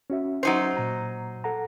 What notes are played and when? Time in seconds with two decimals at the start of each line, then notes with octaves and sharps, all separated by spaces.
0.10 C#4 F#4 E5
0.43 F#3 D#4 C5
0.77 A#2 A#5
1.44 A4 F#5 A#5